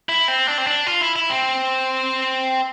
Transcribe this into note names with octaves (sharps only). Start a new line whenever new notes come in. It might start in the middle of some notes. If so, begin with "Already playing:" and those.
E4
C4
D4
C4
D4
F4
E4
E4
C4